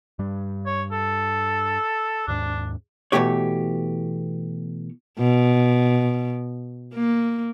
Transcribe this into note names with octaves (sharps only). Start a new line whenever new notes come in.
G2 G3
C#5
A4
D#2 G#2 D4
B2 D#3 E3 A3 G4 C#5
B2
A#3